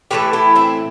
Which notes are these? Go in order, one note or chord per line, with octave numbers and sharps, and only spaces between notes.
A2 E3 A3 G4 B4
E4 G4
C4 E4